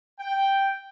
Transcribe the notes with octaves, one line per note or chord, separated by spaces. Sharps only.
G5